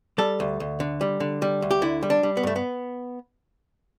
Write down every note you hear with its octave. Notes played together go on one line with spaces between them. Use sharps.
G3 A4
D2
D2
D3
G3
D3
G3
D2
G4
D3 E4
G3
D4
G3
B3
G2 A3
B3